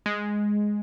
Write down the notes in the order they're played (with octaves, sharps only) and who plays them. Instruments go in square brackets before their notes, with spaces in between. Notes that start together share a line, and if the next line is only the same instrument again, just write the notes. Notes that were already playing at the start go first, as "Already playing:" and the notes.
[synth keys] G#3